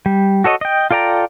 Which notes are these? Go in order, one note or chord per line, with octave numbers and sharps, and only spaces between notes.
G3
F#4 A4 C#5 D#5
D#5 G5
F4 A4 D5 G5 A#5